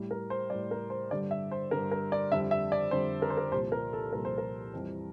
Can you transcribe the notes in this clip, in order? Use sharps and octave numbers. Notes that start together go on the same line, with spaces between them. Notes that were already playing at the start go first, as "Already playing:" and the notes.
Already playing: A2 G3
A#4
C5
A2 G3 D5
A#4
C5
G2 D3 G3 D5
E5
C5
G2 D3 G3 A#4
A#4
D5
F2 D3 G3 E5
E5
D5
F2 D3 G3 C5
A#4
C5
A#4
C2 A#2 F3 C5
A#4
A4
C2 A#2 F3 A#4
C5
A#4
F2 E3 G3